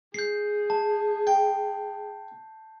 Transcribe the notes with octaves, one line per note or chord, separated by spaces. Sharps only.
G#4 G6 C7
A5
G5